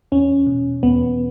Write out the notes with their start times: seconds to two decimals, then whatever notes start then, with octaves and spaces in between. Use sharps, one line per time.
0.12 E2 C#4
0.47 B2
0.83 E2 B3